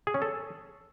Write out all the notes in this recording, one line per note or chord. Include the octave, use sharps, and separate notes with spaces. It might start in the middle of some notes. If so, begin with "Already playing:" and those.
G#4
C#4
A4